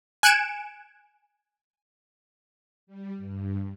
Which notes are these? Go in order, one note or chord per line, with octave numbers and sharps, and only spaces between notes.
G#5 F#6 G#6 C#7 D7 E7
G3
G2